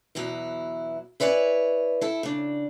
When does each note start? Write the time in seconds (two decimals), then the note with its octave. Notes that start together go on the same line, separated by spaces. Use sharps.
0.15 E2 B2 F#3 E4
1.20 E4 B4 C#5 D5 F#5 G#5
2.01 E4 A4
2.23 C#3 D4